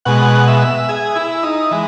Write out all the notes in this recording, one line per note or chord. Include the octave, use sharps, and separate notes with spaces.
B2 G#3 F#5
E5
G#4
E4
D#4
E3 G#3